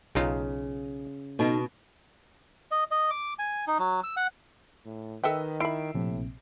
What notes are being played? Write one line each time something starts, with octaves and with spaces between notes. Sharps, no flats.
B1 C#3 D#4 F4
B2 B3 D#4 A4
D#5
D#5
D6
G#5
D#4
F#3
E6
F#5
A2
D#3 A4 B4 D#5 E5 G5 E6
E4 E5 B5 C7 D7
A#1 A2 C3